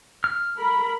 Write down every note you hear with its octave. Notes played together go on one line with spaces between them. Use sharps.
F6
A#4 B5